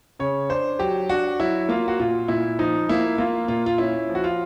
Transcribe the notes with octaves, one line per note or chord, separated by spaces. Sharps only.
C#3 C#5
D4 C5
F#3 G4
D4 F#4
F#3 E4
A#3 F4
F#4
A#2 F4
A#2 E4
F3 D#4
A#3 E4
A#3 F4
A#2 F4
F4
C#4 E4
F3
F#4
F4